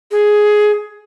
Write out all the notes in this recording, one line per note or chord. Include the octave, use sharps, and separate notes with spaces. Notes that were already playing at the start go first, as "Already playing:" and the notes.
G#4